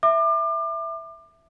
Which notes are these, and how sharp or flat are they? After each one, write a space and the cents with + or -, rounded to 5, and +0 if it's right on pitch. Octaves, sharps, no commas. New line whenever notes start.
E5 +0 D6 +35